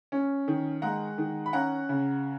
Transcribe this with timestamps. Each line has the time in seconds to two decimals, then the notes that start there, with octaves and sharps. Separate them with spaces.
0.12 C#4
0.48 D#3
0.82 G#3 F#5 A#5
1.18 D#3
1.46 B5
1.53 C#4 F#5 A#5
1.89 C#3